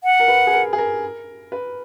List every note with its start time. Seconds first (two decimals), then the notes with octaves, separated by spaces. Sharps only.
0.04 F#5
0.20 A#4
0.28 B4
0.47 G#4
0.53 A#4
0.73 G#4
0.78 A#4
1.52 B4